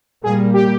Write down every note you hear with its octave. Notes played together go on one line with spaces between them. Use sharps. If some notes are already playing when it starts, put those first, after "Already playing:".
A#2 G3 A#3 G#4
G4